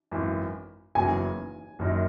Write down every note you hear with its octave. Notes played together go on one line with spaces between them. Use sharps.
G#1 F#2 E3
F#1 E2 C#3 F#3 G#5
F#1 F#2 D#3 F#3